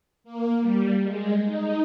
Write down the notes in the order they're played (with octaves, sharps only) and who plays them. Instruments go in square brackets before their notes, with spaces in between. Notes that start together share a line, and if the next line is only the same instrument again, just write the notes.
[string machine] A#3
G3
G#3
D#4